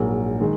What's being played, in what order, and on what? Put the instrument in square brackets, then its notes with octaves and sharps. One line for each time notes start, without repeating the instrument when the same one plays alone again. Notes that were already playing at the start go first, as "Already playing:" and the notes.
Already playing: [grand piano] A#1 G#2 F#3 A#3
D#3 G#3